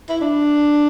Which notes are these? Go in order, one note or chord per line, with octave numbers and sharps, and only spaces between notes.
E4
D4